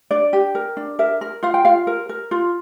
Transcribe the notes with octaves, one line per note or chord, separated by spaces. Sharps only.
D4 D5
G4
A#4
D4
A#4 E5
A#4
F4 F5
G5
F4 F5
A#4
A#4
F4